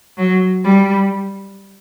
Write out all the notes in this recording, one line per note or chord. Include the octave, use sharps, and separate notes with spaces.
F#3
G3